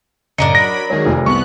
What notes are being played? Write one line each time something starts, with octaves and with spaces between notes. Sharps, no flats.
F#2 A2 C#3 D4 A#4 D#5 C#7
F#3 B5 A#6
D#3 F#3 G#3 G#4 C#5
F1 F2
C2 B3 C#6 F#6